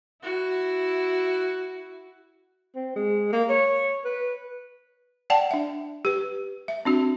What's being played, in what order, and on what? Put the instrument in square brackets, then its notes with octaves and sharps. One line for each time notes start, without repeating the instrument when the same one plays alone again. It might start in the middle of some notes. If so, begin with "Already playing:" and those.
[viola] E4 F#4
[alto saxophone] C4
G#3
A#3
C#5
B4
[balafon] D5 F#5 G5 A5
D4 E5
G4 B4
E5
C4 D4 F#4